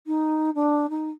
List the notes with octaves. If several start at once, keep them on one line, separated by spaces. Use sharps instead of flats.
D#4
D4
D#4